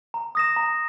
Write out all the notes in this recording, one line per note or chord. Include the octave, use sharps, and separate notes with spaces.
A#5
D#6 A#6 E7
A#5